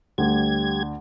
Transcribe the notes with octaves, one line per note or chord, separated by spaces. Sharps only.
D2 G3 G#6